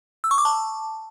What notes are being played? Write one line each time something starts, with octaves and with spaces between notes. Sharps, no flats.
E6
C#6
D6
A5